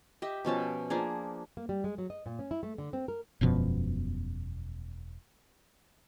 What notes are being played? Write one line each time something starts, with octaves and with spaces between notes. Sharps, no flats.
G4 D#5 E5
B2 F3 C#4 A5
F3 A#3 D4 G#4
A#3
G3
G#3
F#3
D#5
A#2
C#4
E4
A3
D3
C4
A#4
E1 F#2 B2 F3